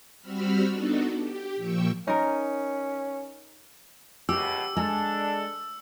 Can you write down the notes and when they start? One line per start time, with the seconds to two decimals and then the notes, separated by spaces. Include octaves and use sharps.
0.21 G3 C4 F#4 B5 E6 F6
0.70 B3 D4 D#4 F#4 A4
1.16 G4
1.56 A#2 F3 G5 C#6 E6
2.08 C#4 D#4 A#4
4.29 C#2 F#2 B2 G4 E6
4.77 G#3 D4 A4